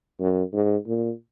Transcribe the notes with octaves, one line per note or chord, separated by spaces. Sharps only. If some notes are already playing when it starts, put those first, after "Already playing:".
F#2
G#2
A#2